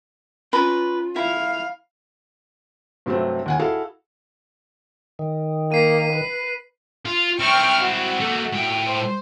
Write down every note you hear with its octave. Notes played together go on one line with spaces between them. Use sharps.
C#4 F4 B4 A#5 B5
E4 F5
G2 C3 F#3 A3 C4
D#2 F#5 G#5
E4 F#4 G#4 A4 F5
D#3
A#3 B6 C7 D#7
B4
F4
C4 E4 G5 C#6 F6
F#4
A3 A#3
A2 G5
C5